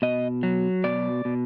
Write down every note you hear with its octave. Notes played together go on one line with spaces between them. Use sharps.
B2 D#5
F#3
B2 D5
B2